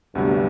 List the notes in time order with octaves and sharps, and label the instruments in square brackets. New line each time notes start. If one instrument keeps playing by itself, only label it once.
[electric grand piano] D2 C3 F#3 B3 F#4 [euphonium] G2